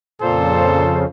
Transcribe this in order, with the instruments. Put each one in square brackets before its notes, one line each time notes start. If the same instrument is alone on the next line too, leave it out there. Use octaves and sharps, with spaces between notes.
[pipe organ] F2 C#3 [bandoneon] A#2 [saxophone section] F4 C5 [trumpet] A4